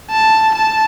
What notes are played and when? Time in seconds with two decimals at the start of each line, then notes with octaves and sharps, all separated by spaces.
0.11 A5
0.54 A5